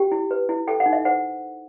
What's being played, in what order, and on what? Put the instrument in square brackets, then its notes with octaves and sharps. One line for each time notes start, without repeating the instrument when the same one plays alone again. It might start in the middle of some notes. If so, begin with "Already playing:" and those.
Already playing: [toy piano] G4 G5
E4
B4
E4
A4 G5
F#5
D#4
E5
C5 F#5